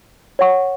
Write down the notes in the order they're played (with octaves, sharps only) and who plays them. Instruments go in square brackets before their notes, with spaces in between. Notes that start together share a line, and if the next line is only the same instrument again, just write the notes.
[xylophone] C#5 F#5 C#6